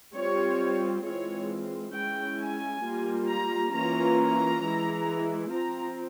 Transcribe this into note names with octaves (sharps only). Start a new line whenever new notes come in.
G3 C4 F4 C#5
E3 G#3 C4 F4 C#5
G#3 C#4 E4 G5
G#5
G3 A#3 F4
A#5
E3 A#3 C#4 F4 A#5
A#5
E3 G#3 E4
F3 C4 F4 A#5